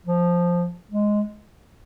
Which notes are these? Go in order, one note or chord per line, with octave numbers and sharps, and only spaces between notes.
F3
G#3